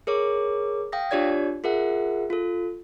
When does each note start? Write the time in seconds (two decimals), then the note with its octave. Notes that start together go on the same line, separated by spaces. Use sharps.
0.07 G#4 A#4 C#5 D6
0.92 F5 G5 D#6 A#6
1.11 D4 F4 G4 C#5 D5 G#6
1.64 F4 G#4 A#4 E5 F#5
2.30 F4 A4